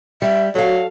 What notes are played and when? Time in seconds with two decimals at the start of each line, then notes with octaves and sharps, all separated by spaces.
0.22 G3 E5
0.55 F#3 F#4 A4 F5